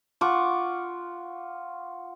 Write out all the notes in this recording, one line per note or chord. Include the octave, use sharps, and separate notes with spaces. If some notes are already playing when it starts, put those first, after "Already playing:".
F4 F#5 C#6 D6